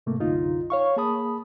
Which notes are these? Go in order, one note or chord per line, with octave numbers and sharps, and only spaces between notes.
G#2 C3 A3 A#3
C2 F#2 D3 D#4 F4
C#5 F5 C#6
A#3 G#4 A5 B5 D#6